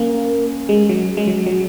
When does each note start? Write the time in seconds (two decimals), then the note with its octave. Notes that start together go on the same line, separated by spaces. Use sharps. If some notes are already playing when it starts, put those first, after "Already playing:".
Already playing: A#3 C#4
0.69 G#3
0.89 F#3
1.17 G#3
1.28 F#3
1.46 F#3